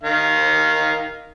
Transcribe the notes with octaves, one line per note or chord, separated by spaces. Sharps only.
D#3 F5